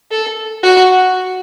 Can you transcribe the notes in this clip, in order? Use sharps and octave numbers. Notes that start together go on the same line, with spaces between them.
A4
F#4